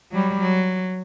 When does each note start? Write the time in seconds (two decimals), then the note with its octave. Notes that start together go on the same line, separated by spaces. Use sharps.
0.12 F#3 G3
0.41 F#3